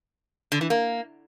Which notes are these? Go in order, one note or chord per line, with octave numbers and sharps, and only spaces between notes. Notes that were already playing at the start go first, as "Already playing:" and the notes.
D3
E3
A#3